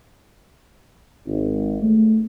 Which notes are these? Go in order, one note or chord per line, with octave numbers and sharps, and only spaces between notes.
G#1
A3